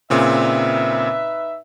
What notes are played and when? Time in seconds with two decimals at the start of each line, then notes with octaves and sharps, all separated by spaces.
0.10 A#2 C#3 C4 D#4 B4 E5